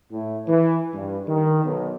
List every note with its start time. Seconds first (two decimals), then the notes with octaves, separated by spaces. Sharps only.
0.11 A2
0.48 E3
0.94 G2
1.28 D#3
1.64 B1